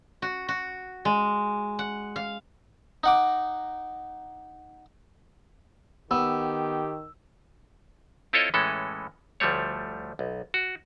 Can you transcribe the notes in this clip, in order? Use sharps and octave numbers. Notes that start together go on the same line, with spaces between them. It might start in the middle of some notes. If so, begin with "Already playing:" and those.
F#4
F#4
G#3
F#5
F5
D#4 F#5 D6
D#3 B3 G4 E6
C4 E4 F4 A4 C#5 D#5
A2 E3 G#3 C#4 A4
D2 F3 G3 A3 C#5
B1
F#4